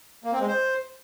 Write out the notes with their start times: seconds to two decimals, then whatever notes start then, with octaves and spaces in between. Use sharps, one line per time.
0.24 A#3
0.32 C4
0.40 G#3
0.48 C5